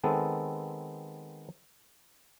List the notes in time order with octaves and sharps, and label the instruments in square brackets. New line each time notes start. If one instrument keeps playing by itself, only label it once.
[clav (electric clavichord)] D#3 G#3 B3 C4 A4